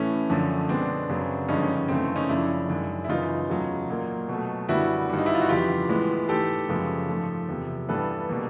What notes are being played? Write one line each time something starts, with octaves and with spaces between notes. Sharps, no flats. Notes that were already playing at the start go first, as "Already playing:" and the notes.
Already playing: A2 E3 A3 C#4
F#2 D3 F3 A3
B2 G#3 B3 C4 D4
F#2 C#3 F#3 B3
G2 D3 F3 G#3 C#4 D#4
C#4
C#4
F#2 C#3 E3 A3 C4
C#4 D#4
F#2 C#3 F3 D4 E4
F#2 D#3 G#3
E4
F#2 C#3 E3 D#4 F4
E2 C#3 F#3 A3
A#2 F#3 A#3
B2 F#3 A3
F#2 D3 G3 B3 E4 F#4
G2 D#3 G3
D#4
E4
F4
F#4
F2 C#3 E3 F4 G4
A2 E3 G#3 B3
G#2 E3 A3 G4 A4
F#2 C#3 F3 G#3 B3
G#2 F3 A3
E2 C3 F3
G2 E3 G3 B3 A4 B4
B2 G3 A#3